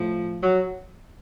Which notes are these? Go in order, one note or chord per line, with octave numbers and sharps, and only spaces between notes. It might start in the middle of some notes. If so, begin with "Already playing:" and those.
Already playing: A2 F3
F#3